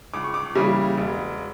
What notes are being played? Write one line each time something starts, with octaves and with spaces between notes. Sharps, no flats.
C#2 D6
C#6
D6
C#3 E3 G3 A#3
E1